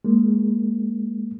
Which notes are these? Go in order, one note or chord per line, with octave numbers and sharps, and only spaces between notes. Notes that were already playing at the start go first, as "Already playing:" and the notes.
G#3 A#3